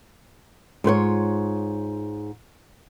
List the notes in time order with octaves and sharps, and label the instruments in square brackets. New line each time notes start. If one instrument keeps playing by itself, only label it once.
[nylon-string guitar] G#2 F4 B4 C#5